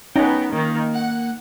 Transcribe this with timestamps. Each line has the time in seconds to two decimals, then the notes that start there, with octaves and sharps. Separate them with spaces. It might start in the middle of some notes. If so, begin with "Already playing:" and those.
0.16 B3 C#4 D#4 G5 A#5
0.53 D#3 A#3
0.92 F#5